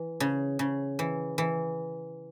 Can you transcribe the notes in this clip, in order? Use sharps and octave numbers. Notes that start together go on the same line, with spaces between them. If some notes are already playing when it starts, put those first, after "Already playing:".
Already playing: E3
C#3
C#3
E3
E3